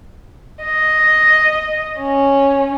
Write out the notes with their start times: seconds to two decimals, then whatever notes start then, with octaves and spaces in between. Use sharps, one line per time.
0.64 D#5
2.00 C#4